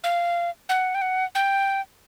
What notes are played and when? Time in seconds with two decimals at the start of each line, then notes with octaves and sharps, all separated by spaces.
0.04 F5
0.69 F#5
0.95 G5
1.02 F#5
1.35 G5